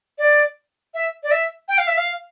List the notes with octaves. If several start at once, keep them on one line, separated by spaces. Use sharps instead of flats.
D5
E5
D5
E5
G5
F5
E5
F5